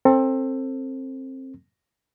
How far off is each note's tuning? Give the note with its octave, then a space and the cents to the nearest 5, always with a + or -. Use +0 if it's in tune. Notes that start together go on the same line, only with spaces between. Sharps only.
C4 +20 A4 +25